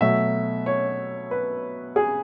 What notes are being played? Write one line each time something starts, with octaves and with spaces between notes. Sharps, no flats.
B2 F#3 A3 E5
C#5
B4
G#4